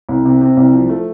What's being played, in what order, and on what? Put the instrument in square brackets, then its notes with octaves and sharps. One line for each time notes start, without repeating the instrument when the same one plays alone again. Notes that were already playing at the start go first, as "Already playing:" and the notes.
[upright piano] C2
C3
C3
C2
F3
A3